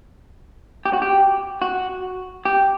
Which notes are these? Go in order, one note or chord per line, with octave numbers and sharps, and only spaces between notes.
G4
F#4
G4
F#4
G4